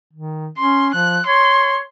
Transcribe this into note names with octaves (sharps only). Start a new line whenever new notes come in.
D#3
C#4 C6
F3 F#6
C#5 C6